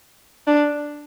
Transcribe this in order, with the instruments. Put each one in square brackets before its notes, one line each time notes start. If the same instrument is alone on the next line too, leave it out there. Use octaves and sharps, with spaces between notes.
[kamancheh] D4